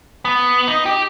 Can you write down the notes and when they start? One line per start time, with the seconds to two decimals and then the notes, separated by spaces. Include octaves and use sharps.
0.25 B3
0.68 D#4
0.86 G4